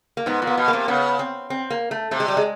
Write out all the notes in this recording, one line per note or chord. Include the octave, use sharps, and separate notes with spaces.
A#3
G#2 B3
A#2
B3
B2
A#3
C3
C#3 B3
C4
C4
A#3
A3
C3 A3
G#3
G3
G#3